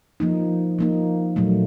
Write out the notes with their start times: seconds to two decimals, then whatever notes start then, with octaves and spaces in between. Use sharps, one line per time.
0.20 F3 A#3 D#4
0.79 F3 A#3 D#4
1.36 A#2 F#3 A3